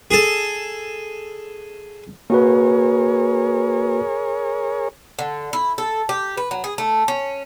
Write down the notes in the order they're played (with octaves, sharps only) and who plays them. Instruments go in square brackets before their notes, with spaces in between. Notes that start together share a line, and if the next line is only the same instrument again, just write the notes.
[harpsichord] G#4 A4
[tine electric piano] A#3 F#4 B4 [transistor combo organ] G#4 A#4 C#5
[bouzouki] D3
E4
A4
G4
B4
F#3
G#4
A3
C#4